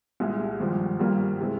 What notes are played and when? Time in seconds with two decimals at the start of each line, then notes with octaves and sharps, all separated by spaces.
0.20 C2 A#2 G#3 E4 G#4
0.60 G#1 G2 F3
0.99 G#1 G2 G3 A#3 F4
1.41 C3 E3 G#3